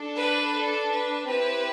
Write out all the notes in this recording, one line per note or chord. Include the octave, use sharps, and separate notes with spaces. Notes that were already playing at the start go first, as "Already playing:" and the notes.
Already playing: D4 A4
B4
A4
B4
C4 E4 G4 B4